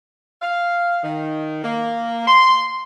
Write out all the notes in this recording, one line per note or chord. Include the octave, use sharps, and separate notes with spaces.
F5
D#3
A#3
C6